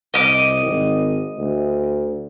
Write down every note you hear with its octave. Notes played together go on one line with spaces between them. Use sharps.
C2 D#5 D6
G#1
D2